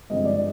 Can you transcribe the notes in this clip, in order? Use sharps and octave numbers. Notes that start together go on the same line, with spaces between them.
G2 D3 F3 G#3 C4 D#5
D5